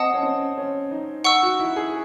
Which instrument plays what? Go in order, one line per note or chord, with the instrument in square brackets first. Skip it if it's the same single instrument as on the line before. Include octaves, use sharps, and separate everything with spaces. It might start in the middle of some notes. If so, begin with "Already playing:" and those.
Already playing: [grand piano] C4 [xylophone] D#5 F#5 A5 D#6
[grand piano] C#4
C4
C#4
D#4
[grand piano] D#4 [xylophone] F#5 C#6 E6
[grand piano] F#4
E4
G#4